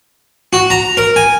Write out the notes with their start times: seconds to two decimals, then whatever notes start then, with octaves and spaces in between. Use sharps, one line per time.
0.53 F#4
0.70 A#5
0.97 A#4
1.16 G#5